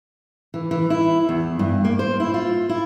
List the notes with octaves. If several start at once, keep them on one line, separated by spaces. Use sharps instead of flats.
E3
E3
E4
E2
G2
A#3
C5
E4
F4
E4